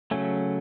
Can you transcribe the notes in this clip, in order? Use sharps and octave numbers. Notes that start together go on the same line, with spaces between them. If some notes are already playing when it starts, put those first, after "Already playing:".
C#3 F#3 A3 C#4